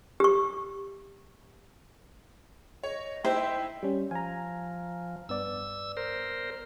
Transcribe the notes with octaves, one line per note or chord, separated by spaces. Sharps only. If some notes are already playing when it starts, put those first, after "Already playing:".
G4 C#6
C#5 D#5
D#4 E4 C5 E5 G5
G3 C#4
F3 G#5 A#5
G2 B3 D5 E6
A#4 C5